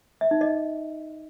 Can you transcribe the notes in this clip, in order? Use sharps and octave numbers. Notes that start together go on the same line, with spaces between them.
E5
D#4
D#5